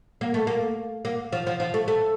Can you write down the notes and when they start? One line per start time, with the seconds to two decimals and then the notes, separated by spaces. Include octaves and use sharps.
0.21 A#3
0.34 A3
0.47 A#3
1.05 A#3
1.33 F3
1.47 F3
1.60 F3
1.74 A3
1.88 A3